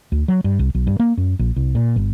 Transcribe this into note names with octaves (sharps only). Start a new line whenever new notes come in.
D2
F#3
G2
C2
B1
G2
A#3
F#2
A#1
C2
A#2
G1